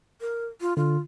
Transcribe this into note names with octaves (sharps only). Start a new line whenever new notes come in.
A#4
F4
D3 F4